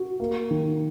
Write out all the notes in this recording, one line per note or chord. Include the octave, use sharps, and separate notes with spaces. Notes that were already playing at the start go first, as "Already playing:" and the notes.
Already playing: F#4
A#3
D#3